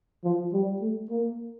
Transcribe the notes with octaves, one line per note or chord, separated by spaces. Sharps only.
F3
G3
A3
A#3